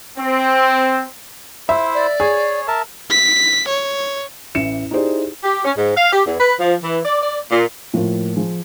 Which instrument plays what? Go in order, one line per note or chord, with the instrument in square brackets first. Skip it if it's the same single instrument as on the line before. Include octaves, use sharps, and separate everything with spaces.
[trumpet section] C4
[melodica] E4 C5 [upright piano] E5
[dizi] D5
[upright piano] G#4 [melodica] C#5
[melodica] A#4 E5 A5
[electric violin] B6
C#5
[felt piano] A1 E5 C#7 E7
D#4 E4 G4 G#4 C5 D5
[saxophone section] G4
C#4
G#2
F5
G4
E2
B4
F3
E3
D5
D5
A#2
[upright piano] A2 F3 A#3 F4
F3 G#4